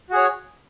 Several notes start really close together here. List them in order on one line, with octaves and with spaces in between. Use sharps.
F#4 G#4 C#5